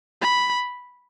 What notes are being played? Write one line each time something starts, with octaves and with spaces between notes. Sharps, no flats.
B5